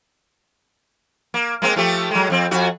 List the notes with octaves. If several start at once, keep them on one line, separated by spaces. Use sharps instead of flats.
A#3
G#3 A#3 C4
F3 A3 G4
F#3 G#3
F2 C4
F2 F#4